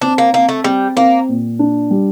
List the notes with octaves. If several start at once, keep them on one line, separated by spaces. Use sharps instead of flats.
C4 D4
A#3
A#3 C4
A3
G3 C4
A#3 C4
A#2
D4
G3